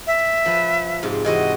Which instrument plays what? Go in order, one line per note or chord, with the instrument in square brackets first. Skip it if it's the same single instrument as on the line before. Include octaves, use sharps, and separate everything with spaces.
[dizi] E5
[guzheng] F3 B4
G#2 C3
[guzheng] C3 E3 F#4 [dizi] D#5